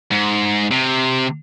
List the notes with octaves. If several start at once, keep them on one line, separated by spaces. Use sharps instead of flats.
G#2
C3